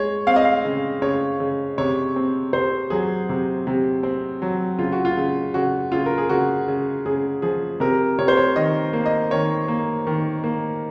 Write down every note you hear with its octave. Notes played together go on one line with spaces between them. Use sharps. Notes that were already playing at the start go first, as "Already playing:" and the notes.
Already playing: G#3 C#5
C4 F5
D#5
F5
C#3
C#3 C#5
C#3
C3 C#5
C4
C3 C5
F#3 G#4
C3
C3
C4
F#3
C#3 F4
F#4
F4
C#3
C#3 F#4
C#3 F4
A#4
G#4
C#3 F#4
C#3
C#3 G#4
F3 G#4
C3 A#4
C3 C#5
C5
C#5
D#3 D#5
A#3
D#5
D#3 C#5
A#3
D#3
A#3